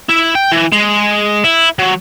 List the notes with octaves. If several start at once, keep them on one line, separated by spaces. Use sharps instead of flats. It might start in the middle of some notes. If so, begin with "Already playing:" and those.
E4
G5
E3
G#3
E4
F#3